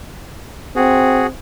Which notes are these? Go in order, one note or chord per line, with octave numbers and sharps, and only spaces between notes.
C4 F#4 G#4